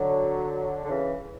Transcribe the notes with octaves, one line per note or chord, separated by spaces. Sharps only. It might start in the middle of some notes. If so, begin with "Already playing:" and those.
Already playing: D3 F#3
D3
C#3 E3